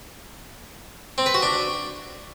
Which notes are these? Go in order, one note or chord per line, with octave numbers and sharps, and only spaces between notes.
C4
B4
F#4
D4